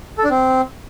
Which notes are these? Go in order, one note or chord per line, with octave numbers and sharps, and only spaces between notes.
A4
D4
C4